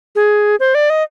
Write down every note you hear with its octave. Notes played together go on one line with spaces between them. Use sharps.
G#4
C5
D5
D#5